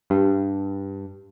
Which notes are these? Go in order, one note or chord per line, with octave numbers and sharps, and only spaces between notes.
G2